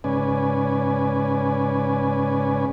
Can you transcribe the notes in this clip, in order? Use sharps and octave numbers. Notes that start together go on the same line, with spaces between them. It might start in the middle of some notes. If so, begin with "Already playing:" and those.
G#2 C#3 C#4 B4 D5 G#5